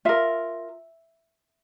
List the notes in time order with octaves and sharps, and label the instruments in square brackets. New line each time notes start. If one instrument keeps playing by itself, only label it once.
[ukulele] F4 A#4 E5